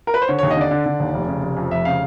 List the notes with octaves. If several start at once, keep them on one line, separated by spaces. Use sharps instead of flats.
A#4
B4
C5
D3 C#5
D#2 C#5
D#5
D3 D5
D3
D3
D#2
F1
C#3
F1
F2
F1 E5
C#3 F5